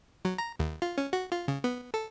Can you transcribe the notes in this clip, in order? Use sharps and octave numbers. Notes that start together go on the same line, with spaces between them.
F#3
A#5
D#2
F4
C#4
F#4
F4
C#3
B3
A4